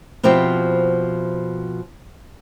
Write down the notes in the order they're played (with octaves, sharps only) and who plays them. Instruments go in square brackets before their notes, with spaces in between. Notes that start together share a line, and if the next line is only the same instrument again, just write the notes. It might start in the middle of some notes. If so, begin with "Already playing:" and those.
[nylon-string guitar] B2 F3 C4 E4 G4